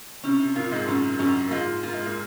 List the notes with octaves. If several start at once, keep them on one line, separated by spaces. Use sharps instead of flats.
C3 C#4
C3
A#2 A#3 F4
G#2 G#3
F#2 F#3 C#4
F#2 F#3 C#4
A#3
G#2 G#3 F4
A#3 F4
G#3
A#2 A#3